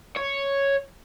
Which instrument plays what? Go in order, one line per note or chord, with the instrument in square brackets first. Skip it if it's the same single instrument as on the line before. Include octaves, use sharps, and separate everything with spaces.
[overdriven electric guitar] C#5